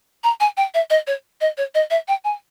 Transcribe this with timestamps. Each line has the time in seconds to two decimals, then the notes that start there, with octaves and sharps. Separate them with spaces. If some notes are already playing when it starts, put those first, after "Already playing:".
0.24 A#5
0.40 G#5
0.57 G5
0.74 E5
0.90 D#5
1.07 C#5
1.41 D#5
1.57 C#5
1.75 D#5
1.90 E5
2.08 G5
2.24 G#5